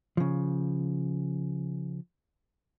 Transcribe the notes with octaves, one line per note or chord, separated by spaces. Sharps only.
C#3 F3